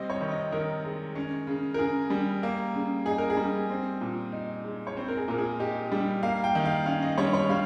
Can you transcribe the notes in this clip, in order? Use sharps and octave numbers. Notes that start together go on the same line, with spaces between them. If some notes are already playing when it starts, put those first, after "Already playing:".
Already playing: C3 G3 C4 D#5
C#5
D#3
D#5
D#3 A#4
G#3
C#4
C#3
A#4
C#3 G#4
G3
A#3
C#3
D#4 G#4
A#4
G#4
G3
C4
A#2
D#4
G#3
C#5
C4 C5
A#4
G#4
A#2 A#4
G#4
D#4 G4
G3
A#3 F5
G5
D#3
F5
C#4 F5
D#5
G3 C#5
C#5
G3 F5